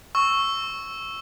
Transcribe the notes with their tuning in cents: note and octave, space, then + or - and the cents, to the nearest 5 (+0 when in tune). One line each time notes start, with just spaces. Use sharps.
C#6 -5 E6 +0